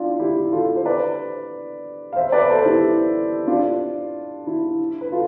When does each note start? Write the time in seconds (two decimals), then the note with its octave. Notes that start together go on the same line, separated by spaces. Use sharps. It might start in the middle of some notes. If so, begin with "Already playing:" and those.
Already playing: D4 E4 F4
0.20 E4 G4
0.52 F4 A4
0.76 C5
0.85 B4 D5
2.13 F5
2.16 C5 E5
2.32 B4 D5
2.49 A4 C5
2.66 E4 G4
3.47 D4 F4
4.47 E4
5.01 B4
5.12 F4 A4